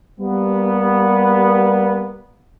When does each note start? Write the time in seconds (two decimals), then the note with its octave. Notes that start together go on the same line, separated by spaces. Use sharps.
0.20 G3 A#3 B3